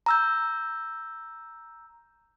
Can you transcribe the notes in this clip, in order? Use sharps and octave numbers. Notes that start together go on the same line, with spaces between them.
A#5 E6 G6